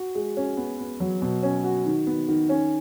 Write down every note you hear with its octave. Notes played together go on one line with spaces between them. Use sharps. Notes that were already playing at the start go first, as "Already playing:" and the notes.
Already playing: F#4
G#3
C#4
B3
B3
F#3
B2
C#4
F#4
D#3
B3
D#3
C#4